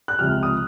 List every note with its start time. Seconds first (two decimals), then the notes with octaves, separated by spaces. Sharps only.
0.08 F#6
0.19 C#2 C3 F3 F6
0.43 D#6